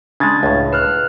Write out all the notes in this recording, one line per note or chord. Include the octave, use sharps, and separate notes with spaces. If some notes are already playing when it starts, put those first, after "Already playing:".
C#3 G#3 D4 G#6 A6
C#2 A2
B4 F6 F#6